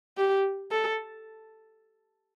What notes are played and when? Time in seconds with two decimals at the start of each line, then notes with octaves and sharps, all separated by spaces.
0.18 G4
0.72 A4